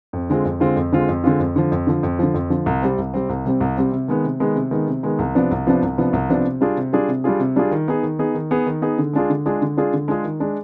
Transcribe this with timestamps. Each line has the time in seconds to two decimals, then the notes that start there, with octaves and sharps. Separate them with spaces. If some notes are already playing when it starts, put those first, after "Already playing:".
0.13 F2
0.30 D3 G#3 C4 F4
0.45 F2
0.60 D3 G#3 C4 F4
0.76 F2
0.92 D3 G#3 C4 F4
1.09 F2
1.24 D3 G#3 C4 F4
1.39 F2
1.56 D3 F3
1.72 F2
1.87 D3 F3
2.03 F2
2.19 D3 F3
2.34 F2
2.50 D3 F3
2.66 C2
2.82 C3 G3 C4
2.98 C2
3.14 C3 G3 C4
3.29 C2
3.45 C3 G3 C4
3.60 C2
3.77 C3 G3 C4
3.92 C3
4.08 D#3 G#3 B3
4.24 C3
4.40 D#3 G#3 B3
4.55 C3
4.71 D#3 G#3 B3
4.87 C3
5.03 D#3 G#3 B3
5.19 C2
5.35 C3 F3 B3 D4
5.51 C2
5.67 C3 F3 B3 D4
5.83 C2
5.98 C3 F3 B3 D4
6.13 C2
6.29 C3 F3 B3 D4
6.45 C3
6.61 G3 D4 F4 G#4
6.77 C3
6.93 G3 D4 F4 G#4
7.08 C3
7.24 G3 D4 F4 G#4
7.39 C3
7.56 G3 D4 F4 G#4
7.71 D#3
7.88 B3 D#4 G#4
8.03 D#3
8.19 B3 D#4 G#4
8.35 D#3
8.51 B3 D#4 G#4
8.66 D#3
8.82 B3 D#4 G#4
8.98 D3
9.13 G#3 D4 F4 G#4
9.30 D3
9.46 G#3 D4 F4 G#4
9.62 D3
9.77 G#3 D4 F4 G#4
9.93 D3
10.08 G#3 D4 F4 G#4
10.24 D#3
10.40 G#3 D4